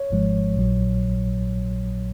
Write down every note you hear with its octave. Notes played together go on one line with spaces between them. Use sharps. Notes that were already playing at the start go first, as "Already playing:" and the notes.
Already playing: C#5
G#1 G#2 F3 G#3
A#1 A#2 F#3